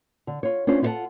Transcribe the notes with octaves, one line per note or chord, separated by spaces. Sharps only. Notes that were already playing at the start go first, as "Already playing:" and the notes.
D3
F4 C#5
C#4 D4 F4 C5
E4 F4 A4 C#5 F#5 A5